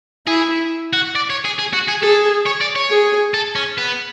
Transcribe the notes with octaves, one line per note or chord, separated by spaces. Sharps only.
E4 G#4
F#4
D5
C#5
G#4
G#4
F#4
G#4
G#4 A4
C#5
D5
C#5
G#4
A4
C#4
B3